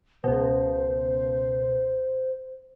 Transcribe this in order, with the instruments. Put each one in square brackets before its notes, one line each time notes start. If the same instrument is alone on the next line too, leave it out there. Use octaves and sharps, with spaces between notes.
[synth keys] C#2 B2 [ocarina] C5